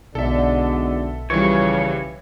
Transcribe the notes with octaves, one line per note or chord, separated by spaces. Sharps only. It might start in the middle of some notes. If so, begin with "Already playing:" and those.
B1 G#2 B2 D3 A4 E5
C#3 E3 F3 G3 C#5